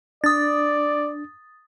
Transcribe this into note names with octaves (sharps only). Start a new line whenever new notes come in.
D4 D5 D#6 A6